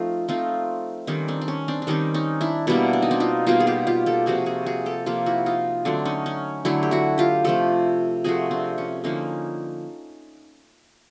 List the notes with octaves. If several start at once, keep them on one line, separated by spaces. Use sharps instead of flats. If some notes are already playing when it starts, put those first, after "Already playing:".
Already playing: F3 A3 C4 D#4 F4
F3 A3 C4 D#4 F4
D#3 G3 C4 C#4 D#4
C4 D4
D4
C#4
C4 D4
D4
D#3 G3 C4 C#4 D#4
C#4 D#4
D4 E4
B2 G3 A#3 D4 E4
D4
D#4
C4 D4
D#4 F4
B2 G3 A#3 D#4 F4
G#4
F4 G4
F4 G4
G4 A4
C3 F3 A#3 F#4 G#4
F#4 G#4
F#4 G#4
G4 A4
C3 F3 A#3 F4 G4
E4 F#4
D#4 F4
D3 F#3 A3 C4 D4
C#4 D#4
C#4
D3 F#3 A3 D4 E4
G4
E4 F#4
F4 G4
C3 F3 A3 G4 A4
C3 F3 A3 F#4 G#4
C4 D4
C#4
D3 F3 A#3 C#4 D#4